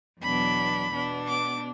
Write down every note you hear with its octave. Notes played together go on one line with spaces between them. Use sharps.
E2 B2 F#3 D4 B5
B2 B3 D4
D6